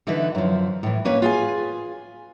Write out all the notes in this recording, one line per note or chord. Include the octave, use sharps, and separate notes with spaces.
D3 E3 D#4 E4 B4
F#2 F3
A2 E3
A#3 C#4 B4 C#5
F4 G#4 G#5